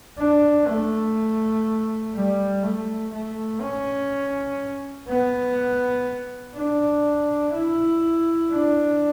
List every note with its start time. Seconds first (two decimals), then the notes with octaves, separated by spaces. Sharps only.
0.18 D4
0.67 A3
2.14 G3
2.63 A3
3.13 A3
3.61 C#4
5.08 B3
6.55 D4
7.53 E4
8.51 D4